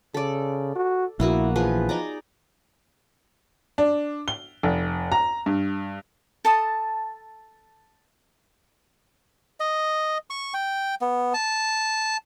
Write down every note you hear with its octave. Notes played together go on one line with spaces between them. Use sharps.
C#3 A4 D5
F#4
A#1 A#3 B3 E4 F#4
E3 F3 G#4 B4
D#4 D5 A#5
D4
G7
F1
A#5
G2
A4 A5 D#6
D#5
C#6
G5
B3
A5